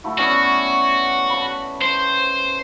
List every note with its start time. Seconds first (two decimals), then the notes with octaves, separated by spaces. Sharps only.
0.04 A3 E4 F#4
0.18 B3 C#4 F#4 D5
1.30 A5 B5
1.81 C5